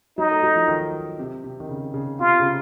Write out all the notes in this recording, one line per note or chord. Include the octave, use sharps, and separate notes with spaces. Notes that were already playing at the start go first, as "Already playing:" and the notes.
F#3 D#4
A3
F#3
F3
D#3
C3
C3
D#3
C#3
C#3
C3 F4
C#3
C3